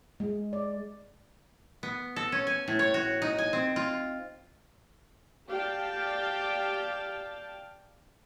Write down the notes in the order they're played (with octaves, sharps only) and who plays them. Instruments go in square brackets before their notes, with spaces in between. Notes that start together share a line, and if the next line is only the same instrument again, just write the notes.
[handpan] G#3
D5
[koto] B3
A4
C#4
G#5
A2
C#5
F#4
D#4
G#5
C4
F4
[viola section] G4 D5 F5 G5 A5